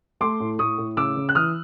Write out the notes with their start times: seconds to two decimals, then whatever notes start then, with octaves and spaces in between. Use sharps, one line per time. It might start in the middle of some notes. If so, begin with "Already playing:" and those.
0.21 A3 C6 D6
0.40 A2
0.59 A2 C#6 D#6
0.78 A2
0.97 C#3 D6 E6
1.16 C#3
1.29 F#6
1.35 E3 D#6 F6